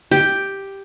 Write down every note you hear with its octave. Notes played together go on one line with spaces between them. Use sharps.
G4